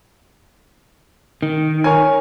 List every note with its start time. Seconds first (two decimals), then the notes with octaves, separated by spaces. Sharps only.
1.42 D#3
1.84 A#4 C#5 G#5